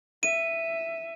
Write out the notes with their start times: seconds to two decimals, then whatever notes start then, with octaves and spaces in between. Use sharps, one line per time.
0.23 E5 D#7